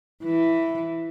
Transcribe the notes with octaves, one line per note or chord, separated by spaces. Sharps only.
E3